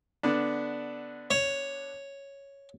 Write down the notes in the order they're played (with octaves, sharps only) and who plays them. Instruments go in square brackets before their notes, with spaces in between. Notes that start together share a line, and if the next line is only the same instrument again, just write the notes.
[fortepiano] D3 B3 D4
[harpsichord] C#5